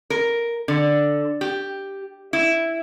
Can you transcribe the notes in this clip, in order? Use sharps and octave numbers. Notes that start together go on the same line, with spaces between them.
A#4
D3
G4
E4